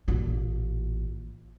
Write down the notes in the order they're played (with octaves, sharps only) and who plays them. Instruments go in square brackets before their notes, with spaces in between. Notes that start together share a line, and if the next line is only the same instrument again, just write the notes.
[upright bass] A1 A#2